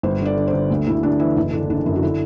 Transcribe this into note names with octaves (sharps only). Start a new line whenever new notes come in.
G1 C5
D3
D5
D3
C5
D3
D2
D2 E4
D2 D4
E3 E4
F#1 E4
D3 D4
F#1 D4
F#2 E4
F#4
D3 E4